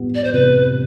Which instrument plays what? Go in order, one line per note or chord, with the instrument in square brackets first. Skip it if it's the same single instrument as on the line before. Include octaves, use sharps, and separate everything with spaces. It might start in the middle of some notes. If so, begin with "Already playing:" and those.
Already playing: [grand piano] G3 B3
[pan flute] D5
C5
[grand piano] C3 [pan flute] B4